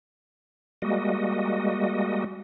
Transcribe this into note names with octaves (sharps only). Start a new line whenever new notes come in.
G3 G#3 A#3 F#4 D#5